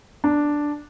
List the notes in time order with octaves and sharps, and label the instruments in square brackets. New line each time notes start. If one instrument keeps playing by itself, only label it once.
[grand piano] D4